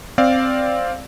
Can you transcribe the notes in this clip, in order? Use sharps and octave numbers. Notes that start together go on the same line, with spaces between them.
C4 D5 F5